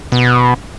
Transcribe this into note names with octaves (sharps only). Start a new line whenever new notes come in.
B2